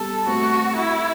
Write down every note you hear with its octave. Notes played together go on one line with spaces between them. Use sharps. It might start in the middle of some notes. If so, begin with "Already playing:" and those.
Already playing: G3 B3 A4
A3 C4 F#4
E4